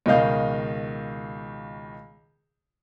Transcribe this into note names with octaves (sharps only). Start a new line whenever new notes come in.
C#2 B2 D#3 D#5 F5 G6